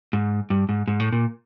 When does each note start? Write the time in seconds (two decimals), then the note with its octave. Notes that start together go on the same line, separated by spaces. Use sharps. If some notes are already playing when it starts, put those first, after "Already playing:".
0.13 G#2
0.50 G2
0.69 G#2
0.88 G#2
1.00 A2
1.12 A#2